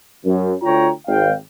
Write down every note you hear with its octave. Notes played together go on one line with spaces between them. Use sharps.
F#2
D2 F4 C#5 G5 A#5
G#1 F5 G5